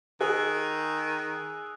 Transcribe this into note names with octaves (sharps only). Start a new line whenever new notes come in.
D#3 G#4 D#6 E6 F#6